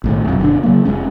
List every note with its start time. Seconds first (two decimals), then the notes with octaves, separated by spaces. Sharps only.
0.04 B1 A2 D#3
0.25 F1 B1
0.40 F#1 B2 D3 D4
0.63 C#3 F#3 A#3
0.85 F1 G#2 G#3 C#4